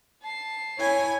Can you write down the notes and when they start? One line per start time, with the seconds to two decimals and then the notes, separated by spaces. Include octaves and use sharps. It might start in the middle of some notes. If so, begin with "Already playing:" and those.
0.22 A5 C7
0.78 E4 C#5 G#5